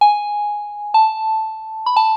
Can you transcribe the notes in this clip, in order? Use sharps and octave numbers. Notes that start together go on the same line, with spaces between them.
G#5
A5
B5
A5